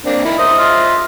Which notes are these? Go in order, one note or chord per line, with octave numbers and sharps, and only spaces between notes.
A#3 C4 D4
D#4 E4 A#4
D#4 C5 D#5 E5
F4